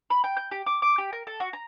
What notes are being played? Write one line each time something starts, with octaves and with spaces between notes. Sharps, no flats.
B5
G5
G6
G4
D6
D6
G4
A#4
A4
F#4
A#5